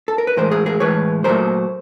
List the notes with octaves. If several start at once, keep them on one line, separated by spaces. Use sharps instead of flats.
A4
A#4
B4
A2 E3 G#3 A#4 C5
G#4 A#4
G#4 A#4
A2 E3 G#3 B4 C#5
A#2 F#3 A3 A#4 C5